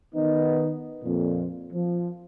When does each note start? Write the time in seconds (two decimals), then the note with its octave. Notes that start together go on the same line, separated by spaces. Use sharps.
0.15 D#3 B3 D#4
1.04 F2 A#2
1.73 F3